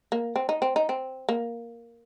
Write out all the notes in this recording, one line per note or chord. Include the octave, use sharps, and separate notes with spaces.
A#3
C4
D#4
C4
D#4
C4
A#3